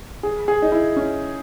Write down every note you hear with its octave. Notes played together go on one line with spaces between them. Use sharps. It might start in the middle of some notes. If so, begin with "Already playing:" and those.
G#4
G#4
D#4
E4
C#4